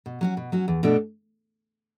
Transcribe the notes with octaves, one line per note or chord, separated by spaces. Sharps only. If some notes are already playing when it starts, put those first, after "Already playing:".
B2
F#3 C#4 F#4
B2
F#3 C#4 F#4
E2
B2 A3 D4